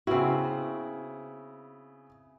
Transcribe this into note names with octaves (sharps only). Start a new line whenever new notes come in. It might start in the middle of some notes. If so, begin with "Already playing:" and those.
C#3 B3 C4 E4 F#4